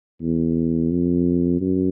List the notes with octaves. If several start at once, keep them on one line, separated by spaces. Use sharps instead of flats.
E2
F2
F#2